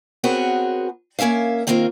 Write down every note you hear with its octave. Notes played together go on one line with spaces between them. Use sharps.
B3 C4 F#4 G#4 A#4 C#5
A#3 C#4 A#4 E5 F5
D#3 A#3 C4 F4 A#4